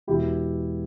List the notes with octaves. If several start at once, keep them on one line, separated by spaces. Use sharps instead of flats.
E1 E2 B2 E4 G4